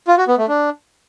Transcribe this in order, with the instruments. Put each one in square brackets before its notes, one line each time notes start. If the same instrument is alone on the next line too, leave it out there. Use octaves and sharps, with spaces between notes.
[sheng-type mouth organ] F4
F#4
B3
A3
D4